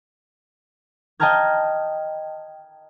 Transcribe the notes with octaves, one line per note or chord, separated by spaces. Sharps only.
D#5 G5 A5 A#5 F6 G#6